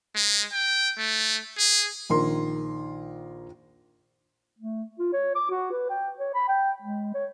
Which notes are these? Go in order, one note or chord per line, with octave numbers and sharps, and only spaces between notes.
G#3
G5
A3
G#4
A#1 D#3 A#4 C6
A3
F4
C#5
D6
F#4
B4
G5
C#5
B5
G5
G#3
C#5